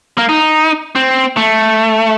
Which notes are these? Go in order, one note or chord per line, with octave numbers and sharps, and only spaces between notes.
A#3
D#4
C4
A3